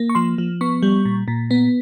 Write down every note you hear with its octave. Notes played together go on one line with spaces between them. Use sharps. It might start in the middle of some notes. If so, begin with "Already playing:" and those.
Already playing: A#3
C#6
F3 C6
F3
B3 C#6
G3
A#2
A#2
B3